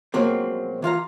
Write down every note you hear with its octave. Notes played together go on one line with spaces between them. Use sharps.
B2 F3 F#3 G#3 A#3 C4
E3 F4 F5 A#5